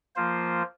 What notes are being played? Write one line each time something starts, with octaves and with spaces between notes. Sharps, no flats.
F3 A#3 F4 C5